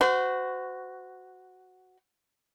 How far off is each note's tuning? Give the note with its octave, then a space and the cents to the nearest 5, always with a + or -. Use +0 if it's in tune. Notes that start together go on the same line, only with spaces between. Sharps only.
F#4 +0 C5 -35